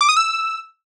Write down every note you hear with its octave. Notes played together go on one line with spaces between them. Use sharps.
D6
D#6
E6